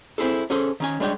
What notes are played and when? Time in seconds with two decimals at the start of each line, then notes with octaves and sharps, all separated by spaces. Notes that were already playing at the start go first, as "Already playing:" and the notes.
0.18 C4 E4 G#4 A4
0.50 C#4 G#4 A4 C5
0.80 D#3 C#4 G#5
1.00 G3 G#3 D4 C#5 G5